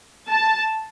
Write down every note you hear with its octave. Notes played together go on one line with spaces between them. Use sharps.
A5